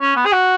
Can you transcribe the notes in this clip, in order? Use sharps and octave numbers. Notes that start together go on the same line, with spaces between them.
C#4
B3
G#4
F#4